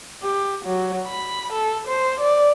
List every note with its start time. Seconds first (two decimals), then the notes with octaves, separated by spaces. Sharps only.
0.23 G4
0.66 F#3
1.07 B5
1.53 A4
1.88 C5
2.20 D5